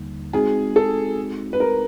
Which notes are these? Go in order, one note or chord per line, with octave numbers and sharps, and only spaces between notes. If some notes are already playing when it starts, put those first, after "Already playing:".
Already playing: D#2 D3 G3 A#3 D#4
G#3 C4 D#4 F#4 G#4
A4
B4
A#4